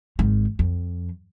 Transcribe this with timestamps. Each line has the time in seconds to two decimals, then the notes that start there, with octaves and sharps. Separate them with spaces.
0.19 G#1 D#3
0.59 F2